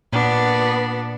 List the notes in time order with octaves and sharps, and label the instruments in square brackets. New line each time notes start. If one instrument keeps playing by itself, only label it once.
[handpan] A#2 [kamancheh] B3 D4